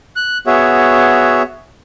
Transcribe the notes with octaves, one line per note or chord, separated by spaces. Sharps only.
F#6
B3 F#4 G#4 C#5 E5